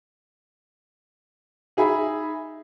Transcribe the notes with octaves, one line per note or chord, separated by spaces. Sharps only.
D#4 G#4 E5 B5